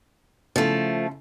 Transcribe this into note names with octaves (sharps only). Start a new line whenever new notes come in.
C#3 F3 A3 E4 A4